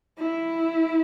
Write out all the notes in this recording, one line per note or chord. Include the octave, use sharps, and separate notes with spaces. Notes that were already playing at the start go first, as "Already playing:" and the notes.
E4